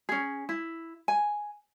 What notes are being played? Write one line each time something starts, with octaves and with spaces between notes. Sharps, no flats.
C#4 G#4
E4
G#5